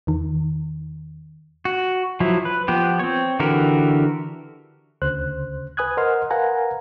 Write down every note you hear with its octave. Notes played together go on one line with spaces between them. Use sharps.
E2 D#3
F#4
F3 F#3 E4
B4
F3 B3 G4
C4 C#5
D3 E3 F#4 G4 A#4
D2 C#3 C5 F#6
B4 G#5 D#6 F#6 G#6
A#4 C5 D#5 F#5 C6 F6
A#4 B4 F5 F#5 G#5 A#5